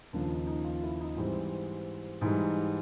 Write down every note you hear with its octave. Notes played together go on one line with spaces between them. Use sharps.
D#2 C#3 F3 A#3 D4
D#4
D#4
F4
E4
D#4
G#2 E3 G3 C4
G#2 E3 G3 D#4